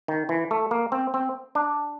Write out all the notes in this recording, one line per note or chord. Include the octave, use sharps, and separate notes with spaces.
D#3
E3
A3
A#3
C4
C4
D4